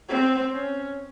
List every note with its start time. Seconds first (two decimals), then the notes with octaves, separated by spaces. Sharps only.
0.09 C4
0.53 C#4